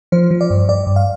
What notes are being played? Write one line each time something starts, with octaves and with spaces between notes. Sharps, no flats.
F3 C5
F3
D5
G2
G2 D5
G2
F5